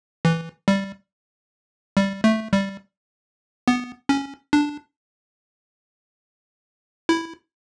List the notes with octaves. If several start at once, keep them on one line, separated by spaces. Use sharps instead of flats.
E3
G3
G3
A3
G3
B3
C#4
D4
E4